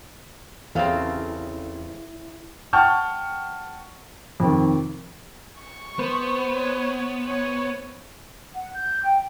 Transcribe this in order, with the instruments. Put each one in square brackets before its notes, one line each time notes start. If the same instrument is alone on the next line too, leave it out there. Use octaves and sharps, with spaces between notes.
[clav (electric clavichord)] A1 C#3 C4 [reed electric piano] E2 [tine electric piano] E4 [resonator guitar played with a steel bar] A4 F5
[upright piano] F#5 G5 A5 C#6 F6 G6
F2 C3 D#3
[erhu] C#6
[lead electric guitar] B3 [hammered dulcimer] C5
[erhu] C#5
C#5
[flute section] F#5
G6
G5